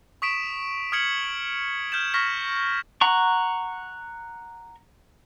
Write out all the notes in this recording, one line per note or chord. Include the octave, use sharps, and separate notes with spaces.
C#6 D#6 B6 D7 E7
D#6 F6 G#6 C#7 F#7
F6 G6 G#6 E7
C#6 F6 A#6 B6
F#5 A#5 C#6